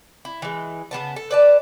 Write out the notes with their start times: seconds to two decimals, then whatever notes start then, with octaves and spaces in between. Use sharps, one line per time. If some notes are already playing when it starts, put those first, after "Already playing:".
0.25 E4
0.42 E3 G#3
0.91 C#3 G#3 B3 A5
1.16 A4
1.31 B4 D5 A5